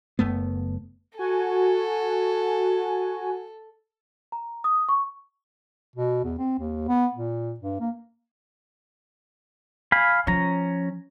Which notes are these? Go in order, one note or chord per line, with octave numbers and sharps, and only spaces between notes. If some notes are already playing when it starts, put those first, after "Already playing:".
F#1 F#2 A3 B3
F#4 A4 G#5
A#5
D#6
C#6
B2
E2
C4
D#2
B3
A#2
G2
A#3
F5 G#5 B5
F3 C#4 A#5